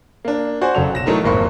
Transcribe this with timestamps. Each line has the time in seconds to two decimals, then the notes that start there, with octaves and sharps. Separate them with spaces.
0.25 A#3 D4
0.61 F#4 C5 D5 G#5
0.75 F#1 C#3 F#3 A4 F7
0.93 B1 A#6 E7
1.06 E3 F#3 A3 D#4 A#4
1.23 D#1 G#1 F2 A#3 B5 C#6